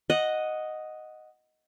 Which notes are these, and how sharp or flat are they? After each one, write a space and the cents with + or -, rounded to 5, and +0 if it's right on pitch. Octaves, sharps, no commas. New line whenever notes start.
D#5 +0 F#5 +0